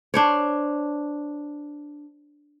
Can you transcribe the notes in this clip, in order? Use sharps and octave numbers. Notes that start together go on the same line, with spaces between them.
D4 C5 C#5